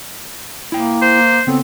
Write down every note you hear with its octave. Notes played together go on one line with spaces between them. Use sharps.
A#3 E4 G5
C5
C#3 B3 C4 A4